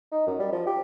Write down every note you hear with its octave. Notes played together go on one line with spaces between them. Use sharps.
D#4
F#2
G3
F3
G4